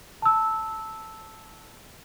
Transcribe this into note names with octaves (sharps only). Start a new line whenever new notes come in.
A5 E6